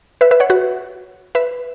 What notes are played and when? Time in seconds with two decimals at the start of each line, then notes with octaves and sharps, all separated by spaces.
0.21 B4 E5
0.31 B4 E5
0.40 C#5 F#5
0.50 F#4 B4
1.35 B4 E5